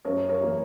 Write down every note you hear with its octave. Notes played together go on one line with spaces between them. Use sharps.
F#2 A#4 C#5
A#4 C#5
E3 A#3